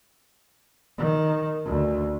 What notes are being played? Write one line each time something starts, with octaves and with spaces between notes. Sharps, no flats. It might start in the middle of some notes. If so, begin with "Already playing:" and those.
D#3
D2